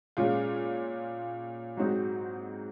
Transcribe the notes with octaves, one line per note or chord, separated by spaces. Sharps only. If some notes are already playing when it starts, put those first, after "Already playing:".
A#2 G#3 C#4 F4
G#2 F#3 C4 D#4 F#4